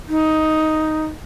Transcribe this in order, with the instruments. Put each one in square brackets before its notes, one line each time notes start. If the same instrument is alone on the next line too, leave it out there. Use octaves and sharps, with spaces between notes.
[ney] D#4